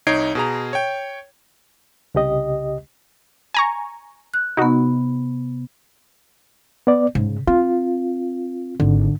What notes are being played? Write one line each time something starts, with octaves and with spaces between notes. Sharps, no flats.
C2 D#4 C#5 G#6 C7 D7
B2 G#4 A#5
C#5 G5
C2 C#3 G4 D#5
G#5 A#5 C#6
F#6
C3 B3 D#4 F#4
B3 D5
G#2 C#3
C4 F4
G#1 D3